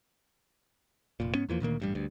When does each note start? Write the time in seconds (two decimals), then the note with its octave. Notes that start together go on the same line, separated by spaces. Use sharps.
1.20 F1 A#2
1.35 G#2 B3 C#4
1.49 E2 E3 F3 A#3
1.60 D2 A#2 D#3 A#3
1.80 A1 G2 G3
1.95 D2 G2